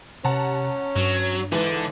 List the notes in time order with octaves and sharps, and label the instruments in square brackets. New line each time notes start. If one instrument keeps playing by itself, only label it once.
[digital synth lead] C3 [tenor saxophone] C#4 [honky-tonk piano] F#5 A5 A#5
[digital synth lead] G2 [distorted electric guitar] F#3
[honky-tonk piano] G#2 E3 [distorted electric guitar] D3 D4